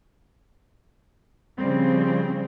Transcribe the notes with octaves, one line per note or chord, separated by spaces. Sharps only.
C#3 F3 G3 C4